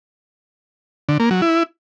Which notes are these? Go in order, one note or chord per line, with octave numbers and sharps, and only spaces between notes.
D3
A#3
F#3
E4